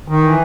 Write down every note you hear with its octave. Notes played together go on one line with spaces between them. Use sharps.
D#3
E3